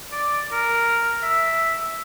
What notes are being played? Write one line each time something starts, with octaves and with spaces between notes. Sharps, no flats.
D5
A#4
E5